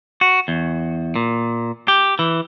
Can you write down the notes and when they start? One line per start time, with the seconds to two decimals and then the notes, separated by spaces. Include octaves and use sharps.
0.21 F#4
0.48 E2
1.16 A#2
1.88 G4
2.19 E3